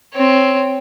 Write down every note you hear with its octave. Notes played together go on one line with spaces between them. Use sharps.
C4 C#5